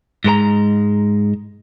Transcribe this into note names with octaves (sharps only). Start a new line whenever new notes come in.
G#2 G#3 A#4 A#5